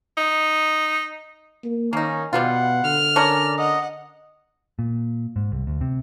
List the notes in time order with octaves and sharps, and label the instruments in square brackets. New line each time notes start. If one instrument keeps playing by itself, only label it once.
[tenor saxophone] D#4
[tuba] A#3
[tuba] D#3 [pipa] A#3 D#4 [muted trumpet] C#4
[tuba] B2 [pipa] G3 B3 F4 [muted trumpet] F#5
[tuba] D3 [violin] F6
[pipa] C#4 D4 A#4 [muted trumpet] D5
[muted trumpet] D#5 [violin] F#5
[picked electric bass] A#2
G#2
C2
D2
C3